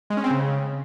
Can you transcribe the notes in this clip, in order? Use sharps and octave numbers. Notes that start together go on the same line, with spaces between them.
G#3
C#4
C4
C#3